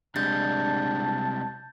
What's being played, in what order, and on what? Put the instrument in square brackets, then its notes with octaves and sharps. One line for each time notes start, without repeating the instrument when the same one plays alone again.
[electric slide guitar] C3 G3 G#3 [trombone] D4 [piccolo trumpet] A5 [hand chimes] G6 A6